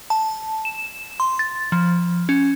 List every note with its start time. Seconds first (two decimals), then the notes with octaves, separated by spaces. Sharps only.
0.10 A5
0.65 E7
1.20 C6
1.39 A6
1.72 F3
2.29 C#4